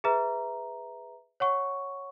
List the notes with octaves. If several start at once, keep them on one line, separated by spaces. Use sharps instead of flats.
G#4 B4 E5 A#5
C#5 F#5 C#6